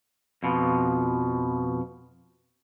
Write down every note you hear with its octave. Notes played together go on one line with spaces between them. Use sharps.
F2 B2 F3